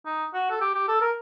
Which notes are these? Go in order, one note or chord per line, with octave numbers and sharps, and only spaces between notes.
D#4
F#4
A4
G4
G4
A4
A#4